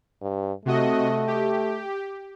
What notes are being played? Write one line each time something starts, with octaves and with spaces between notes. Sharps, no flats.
G2
C3 A3 F#4 D#5
G4